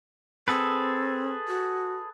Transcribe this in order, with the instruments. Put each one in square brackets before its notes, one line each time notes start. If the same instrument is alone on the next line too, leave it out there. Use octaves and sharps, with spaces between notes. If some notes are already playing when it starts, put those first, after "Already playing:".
[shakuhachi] C4 [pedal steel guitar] G#4 A4 B4
[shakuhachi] F#4